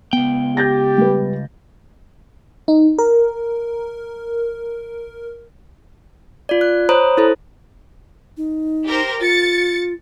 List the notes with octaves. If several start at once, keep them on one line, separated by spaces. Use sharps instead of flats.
C#2 B3 G5
G4 G6 A6 A#6
G3 B4
D#4
A#4
F4 D5
F#6
C5 C#5 A#5 B5 D#6
E4 A4 C5
D#4
G4 A#4 C5
F4 A6 C#7